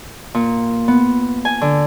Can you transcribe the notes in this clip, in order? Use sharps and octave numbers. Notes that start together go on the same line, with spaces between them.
A#2
B3
G#5
D3